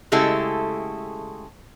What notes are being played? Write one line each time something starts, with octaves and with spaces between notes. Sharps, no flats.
C#3 G#3 A3 E4 G4 A4